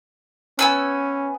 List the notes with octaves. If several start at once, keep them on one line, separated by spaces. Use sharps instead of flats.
B3 C#4 G#5 E6